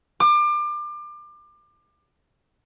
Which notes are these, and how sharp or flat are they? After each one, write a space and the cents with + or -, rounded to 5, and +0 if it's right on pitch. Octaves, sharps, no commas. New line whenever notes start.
D6 +30